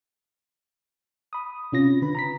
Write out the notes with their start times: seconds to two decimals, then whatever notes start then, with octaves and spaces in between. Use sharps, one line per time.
1.33 B5 D#6
1.72 C3 C#4 F4 A#6
2.02 D3 B4 B5
2.15 A#5 B5 B6